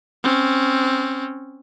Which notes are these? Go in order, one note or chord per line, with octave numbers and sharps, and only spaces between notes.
C4 C#4